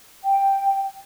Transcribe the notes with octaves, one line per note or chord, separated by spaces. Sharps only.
G5